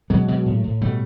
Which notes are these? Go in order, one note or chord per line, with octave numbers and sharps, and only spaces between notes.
B2 F#3 G#3
B2
A2
A2
B2 G3 A3